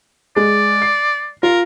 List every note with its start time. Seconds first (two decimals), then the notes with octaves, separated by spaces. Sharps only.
0.36 G#3 D5
0.82 C7
1.43 F4 A#4